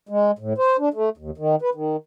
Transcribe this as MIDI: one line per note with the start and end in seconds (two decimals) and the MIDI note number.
0.09 0.31 56
0.39 0.53 45
0.58 0.77 72
0.79 0.89 62
0.94 1.09 57
1.17 1.31 39
1.38 1.56 51
1.62 1.70 71
1.75 1.96 51